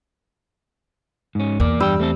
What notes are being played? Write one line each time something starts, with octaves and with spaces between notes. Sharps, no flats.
G#2 C#4
E2 A#3 D5
G2 G3 G5 E6
A3 C4 A4